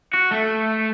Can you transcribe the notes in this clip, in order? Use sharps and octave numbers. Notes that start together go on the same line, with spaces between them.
F#4
A3